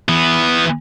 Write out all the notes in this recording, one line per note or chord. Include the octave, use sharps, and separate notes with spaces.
E3 B3